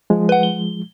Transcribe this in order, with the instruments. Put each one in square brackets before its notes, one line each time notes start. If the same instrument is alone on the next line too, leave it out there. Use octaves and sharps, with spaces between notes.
[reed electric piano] F3 G#3
[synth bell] B4 F#5
G7